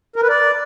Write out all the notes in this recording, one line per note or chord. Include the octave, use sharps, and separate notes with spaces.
A#4
B4
D5